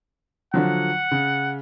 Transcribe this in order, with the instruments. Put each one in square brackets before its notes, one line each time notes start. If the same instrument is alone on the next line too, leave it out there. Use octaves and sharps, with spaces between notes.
[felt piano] D3 F3 F#3 [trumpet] F#5
[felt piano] C#3